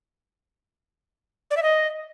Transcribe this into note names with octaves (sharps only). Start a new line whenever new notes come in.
D5
E5
D#5